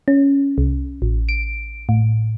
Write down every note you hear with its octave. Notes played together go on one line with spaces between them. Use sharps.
C#4
C2
A1
D7
A2